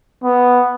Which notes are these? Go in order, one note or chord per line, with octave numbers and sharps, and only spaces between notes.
B3